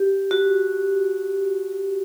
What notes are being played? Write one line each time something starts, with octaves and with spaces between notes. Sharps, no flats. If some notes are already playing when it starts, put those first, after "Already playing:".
Already playing: G4
F#4